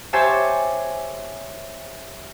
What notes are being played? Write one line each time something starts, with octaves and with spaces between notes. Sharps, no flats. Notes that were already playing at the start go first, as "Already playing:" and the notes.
G4 C5 C#5 E5 G#5 A5